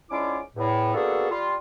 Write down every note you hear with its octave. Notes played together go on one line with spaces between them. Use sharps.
G#2 C#4 D4 E4 F4 D6
E2 A2
A#3 B3 D4 F#4 G#4 A4
G3 F4